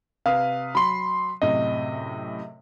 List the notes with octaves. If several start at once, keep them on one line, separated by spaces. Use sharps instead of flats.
C3 B4 F5 D#6
F#3 B5 C6
F#2 A2 C3 D#5